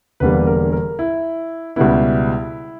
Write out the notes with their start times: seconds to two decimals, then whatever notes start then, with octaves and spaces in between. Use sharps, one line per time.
0.20 E1 E2 D3 G3 A#3 B4
0.47 A#4
0.73 A#4
0.99 E4
1.76 C#2 B2 G3 B3 E4